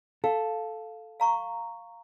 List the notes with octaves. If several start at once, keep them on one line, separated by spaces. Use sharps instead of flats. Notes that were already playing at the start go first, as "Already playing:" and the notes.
A4 F5
F5 A#5 C#6